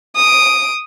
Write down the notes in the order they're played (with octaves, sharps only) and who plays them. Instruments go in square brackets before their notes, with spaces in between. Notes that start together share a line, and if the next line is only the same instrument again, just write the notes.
[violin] D#6 D7